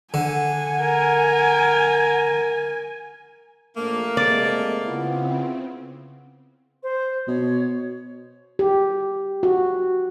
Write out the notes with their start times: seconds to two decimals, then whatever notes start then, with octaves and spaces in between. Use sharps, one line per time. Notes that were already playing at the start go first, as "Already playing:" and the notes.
0.14 D3 F#5 G#5
0.81 A#4
3.76 A#1 A3 A#3
4.17 F2 C3 G#3 D5
4.84 C#3 B3 C4 E4 F4
6.83 C5
7.28 B2 C#5
8.59 G4
9.43 F#4